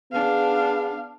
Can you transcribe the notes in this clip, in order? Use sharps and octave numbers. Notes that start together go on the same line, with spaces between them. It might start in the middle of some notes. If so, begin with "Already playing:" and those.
B3 D4 G#4 F5